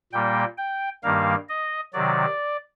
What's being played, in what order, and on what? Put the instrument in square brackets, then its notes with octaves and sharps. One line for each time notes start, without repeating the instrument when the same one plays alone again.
[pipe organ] A#2 G3 A#3 G5
G5
G2 D#3 G3 A#3 F5
D#5
C3 D#3 F#3 D5